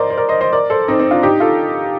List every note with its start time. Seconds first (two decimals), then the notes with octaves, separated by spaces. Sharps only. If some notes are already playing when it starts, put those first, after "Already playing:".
Already playing: A#4 C5 D5 D#5
0.10 C5
0.17 A#4 D5
0.29 C5 D#5
0.41 C5 D#5
0.53 A#4 D5
0.70 A4 C5
0.88 C4 D#4
0.99 C4
1.11 D4 F4
1.22 D#4 G4
1.40 F4 A4